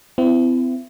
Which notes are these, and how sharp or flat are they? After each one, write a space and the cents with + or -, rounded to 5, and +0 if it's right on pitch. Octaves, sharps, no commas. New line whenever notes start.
C4 -40 E4 +30